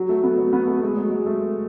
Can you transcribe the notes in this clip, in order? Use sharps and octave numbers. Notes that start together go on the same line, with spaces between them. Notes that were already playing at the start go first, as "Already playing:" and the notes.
Already playing: F#3
A3
B3
F#3
B3
A3
A3
G#3
F#3
G#3
A3